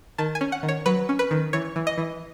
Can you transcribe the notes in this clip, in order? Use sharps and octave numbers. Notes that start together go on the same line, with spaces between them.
D#3 A5
G#5
C#4
F#5
D#3
C#5
F#3 B4
C#4
B4
D#3
E3 C#5
E3
D#5
E3